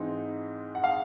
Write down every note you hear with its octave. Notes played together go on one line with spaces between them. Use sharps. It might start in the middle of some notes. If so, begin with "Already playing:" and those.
Already playing: G#2 E3 G#3 C4 D#4
F#5
F5